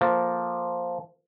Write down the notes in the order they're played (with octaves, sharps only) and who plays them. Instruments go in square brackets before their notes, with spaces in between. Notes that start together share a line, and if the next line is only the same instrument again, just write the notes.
[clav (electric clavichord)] F3 A#3 A4